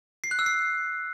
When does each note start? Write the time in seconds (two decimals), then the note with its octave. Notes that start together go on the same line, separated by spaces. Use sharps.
0.24 C7
0.31 F#6
0.39 E6
0.46 C7